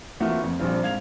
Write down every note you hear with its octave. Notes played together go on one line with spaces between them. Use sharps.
E3 A3 A#3 C4 F4 F#4
F2
A#1 F3 G3 C4 F4
G#2 F5 G#6 F7